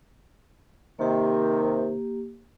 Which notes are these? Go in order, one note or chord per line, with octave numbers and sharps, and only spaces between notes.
C3 D#3 A#3 G4